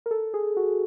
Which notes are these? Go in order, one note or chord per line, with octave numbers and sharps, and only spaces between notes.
A#4
A4
G#4
F#4